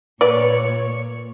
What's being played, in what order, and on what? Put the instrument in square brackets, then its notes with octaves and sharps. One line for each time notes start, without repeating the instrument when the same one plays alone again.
[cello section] A#2 C#5 [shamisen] B4 D5